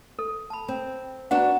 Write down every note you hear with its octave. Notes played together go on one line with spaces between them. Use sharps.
A4
A5 B5
C4
B3 D4 F#4 F#5 A#5